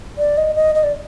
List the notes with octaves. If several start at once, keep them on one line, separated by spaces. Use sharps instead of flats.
D5
D#5
D#5
D#5
D5